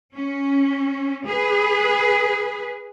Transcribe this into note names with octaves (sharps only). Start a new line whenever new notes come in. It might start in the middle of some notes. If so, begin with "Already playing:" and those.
C#4
G#4 B4